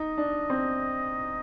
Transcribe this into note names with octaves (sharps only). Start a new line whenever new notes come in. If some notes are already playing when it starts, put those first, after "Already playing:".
Already playing: D#4 D#5
D4
C4